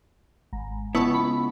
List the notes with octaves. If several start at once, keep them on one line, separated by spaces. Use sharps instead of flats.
G#1
C#2 B3 E4 A5 C#6
B5